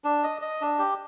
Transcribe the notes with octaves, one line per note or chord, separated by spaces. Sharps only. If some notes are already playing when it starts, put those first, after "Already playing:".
D4
D#5
D#5
D4
G4